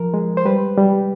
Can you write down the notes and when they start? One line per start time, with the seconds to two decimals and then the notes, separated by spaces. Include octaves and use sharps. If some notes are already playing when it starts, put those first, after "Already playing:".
Already playing: F3 A#4
0.14 G#3
0.37 C5
0.45 G3 B4
0.77 G3